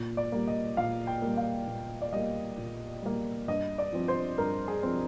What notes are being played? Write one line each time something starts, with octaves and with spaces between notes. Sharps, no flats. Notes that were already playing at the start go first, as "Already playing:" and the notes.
Already playing: A#2
D5
G3 A#3
D#5
A#2 F5
G5
G3 A#3
F5
A#2
D5
G3 A#3 D#5
A#2
G3 A#3
G2 D#5
D5
F3 C4
C5
G2 A#4
G#4
F3 C4